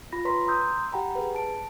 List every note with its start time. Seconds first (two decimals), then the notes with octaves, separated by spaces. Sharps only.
0.12 F4 B5 A#6
0.25 B4 C#5 A#5 C6 B6
0.48 A#5 C6 D#6 E6 G6
0.92 G4 F#5 G5 A#5 B5
1.15 G#4 B4
1.35 A5 D7